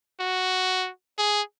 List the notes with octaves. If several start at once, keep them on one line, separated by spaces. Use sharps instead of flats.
F#4
G#4